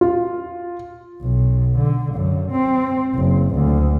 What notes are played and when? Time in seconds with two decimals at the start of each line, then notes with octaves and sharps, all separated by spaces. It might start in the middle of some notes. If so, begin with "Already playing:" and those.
0.01 F4
1.22 B1
1.78 D3
2.15 F#2
2.51 C4
3.15 F#1
3.55 D2